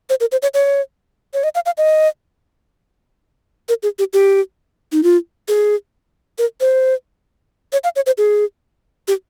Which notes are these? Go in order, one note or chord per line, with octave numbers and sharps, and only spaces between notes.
C5
A#4
C5
C#5
C#5
C#5
D#5
F5
F5
D#5
A#4
G#4
G4
G4
D#4
F4
G#4
A#4
C5
C#5
F5
C#5
C5
G#4
G4